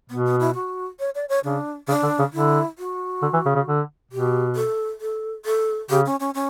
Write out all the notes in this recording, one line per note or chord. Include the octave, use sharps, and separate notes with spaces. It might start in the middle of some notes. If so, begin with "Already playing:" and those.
B2 B3
B3
E4
F#4
C#5
D5
C#5
C#3 D4
C#3 D4
D3
C#3
D3 E4
F#4
D3
E3
C#3
C#3
D3
B2 G4
A4
A4
A4
C#3 G4
C#4
C#4
C#4